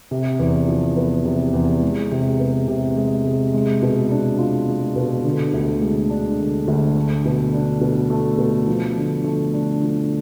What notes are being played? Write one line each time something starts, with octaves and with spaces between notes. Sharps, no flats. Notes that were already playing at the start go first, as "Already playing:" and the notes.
C3
E2
F3
B3
C3
E2
G#3
C3
B3
C3
G#3
C3
G#3
B2
D4
F4
G#3
B2
D3
D2
G#3
D4
D3
D2
A3
B2
D4
B2
A3
B2
F3
D3
A3
D4
F3